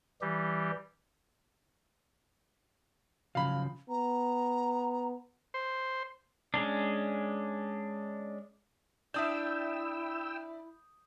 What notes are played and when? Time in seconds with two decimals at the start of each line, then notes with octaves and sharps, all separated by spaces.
0.21 E3 G3 G4
3.35 C#3 F3 F#3 F5 B5
3.89 B3 A#5
5.54 C5
6.54 G#3 C#4 D4
9.14 D4 E4 D5 E5 G5 D#6 E6 G6